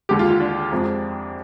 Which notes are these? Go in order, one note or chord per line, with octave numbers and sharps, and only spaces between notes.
D#2 D3 G#3 G4
F4
F4
D4
F2 C3 F3 G#3